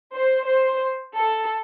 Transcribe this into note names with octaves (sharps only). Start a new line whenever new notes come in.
C5
C5
A4